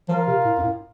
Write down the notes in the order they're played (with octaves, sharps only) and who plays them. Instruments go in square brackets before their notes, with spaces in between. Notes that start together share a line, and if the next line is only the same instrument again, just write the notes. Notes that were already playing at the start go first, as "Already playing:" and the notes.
[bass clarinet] F3 [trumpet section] F4 A#4 F5
[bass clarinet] C3
A2
F#2
A2